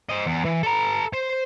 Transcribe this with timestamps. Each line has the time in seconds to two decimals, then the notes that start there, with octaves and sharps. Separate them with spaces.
0.09 C5 D#5
0.26 E2
0.45 E3
0.63 A4 A#5
1.13 C5